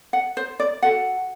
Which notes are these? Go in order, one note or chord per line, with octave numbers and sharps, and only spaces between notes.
F#5
C5
D5
F#4 A4 F#5